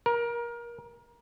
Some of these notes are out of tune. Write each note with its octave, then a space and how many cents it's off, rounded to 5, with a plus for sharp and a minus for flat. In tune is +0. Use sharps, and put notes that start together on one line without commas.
A#4 +25